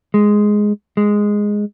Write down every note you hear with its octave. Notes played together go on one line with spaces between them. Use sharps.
G#3
G#3